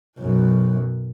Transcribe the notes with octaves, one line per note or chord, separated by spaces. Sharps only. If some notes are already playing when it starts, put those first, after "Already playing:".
B1 F#2